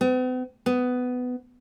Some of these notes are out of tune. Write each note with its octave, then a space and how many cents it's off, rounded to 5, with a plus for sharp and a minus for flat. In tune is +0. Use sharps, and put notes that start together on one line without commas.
B3 +45
B3 +15